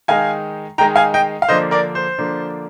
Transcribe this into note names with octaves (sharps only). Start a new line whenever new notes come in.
D#3 G#3 D#4 F5 G#5
D#3 G#3 D#4 G5 A#5
F5 G#5
D#5 G5
F5
D3 F3 A#3 D4 C5 D#5
A#4 D5
C5
D3 F3 A#3 D4